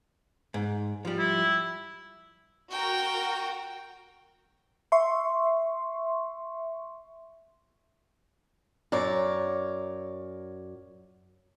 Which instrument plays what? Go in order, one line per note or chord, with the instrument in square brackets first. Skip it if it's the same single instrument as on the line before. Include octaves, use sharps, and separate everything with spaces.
[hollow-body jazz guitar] G#2
F3 G3
[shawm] E4
[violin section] F#4 A#4 [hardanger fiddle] G5
[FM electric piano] E5 C6 C#6
[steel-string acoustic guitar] F#2 C#5 D5 A#5